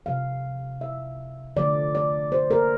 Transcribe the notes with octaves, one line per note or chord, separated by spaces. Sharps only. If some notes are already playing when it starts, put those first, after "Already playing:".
C3 F3 C4 F5
E5
D3 F3 A3 D5
D5
C5
A#4